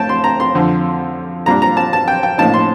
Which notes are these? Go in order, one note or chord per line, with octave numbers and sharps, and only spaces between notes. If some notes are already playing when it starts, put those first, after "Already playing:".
Already playing: A2 A3 G5 A5
C6
A#5
C6
F2 D3 F3
A#2 G3 D4 A#5
A#5
A5
A5
G5
G5
A1 A2 F3 A#3 D#4 A5
C6